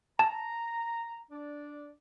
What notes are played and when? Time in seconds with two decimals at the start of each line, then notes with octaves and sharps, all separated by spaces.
0.19 A5 A#5
1.31 D4 D5